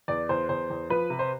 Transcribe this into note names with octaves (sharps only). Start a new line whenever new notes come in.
E2 D5
E2 C5
E2 C5
E2
F3 B4
C3
C5